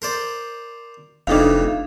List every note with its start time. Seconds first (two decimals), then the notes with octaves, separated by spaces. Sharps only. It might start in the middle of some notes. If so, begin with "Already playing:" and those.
0.02 A#4 C5 D5
1.27 F1 F2 C#3 E3 D4 D#4 F5